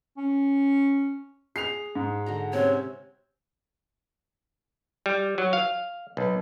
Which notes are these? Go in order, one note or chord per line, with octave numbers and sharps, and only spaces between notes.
C#4
G#4 C7 F7
G#2
D3 F#4 A#5
C3 C4 C#4 C#5
G3
F#3
F5
B1